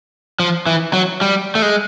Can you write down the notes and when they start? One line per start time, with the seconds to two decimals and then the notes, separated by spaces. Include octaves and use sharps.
0.40 F3
0.66 E3
0.93 F#3
1.21 G3
1.55 A3
1.62 G#3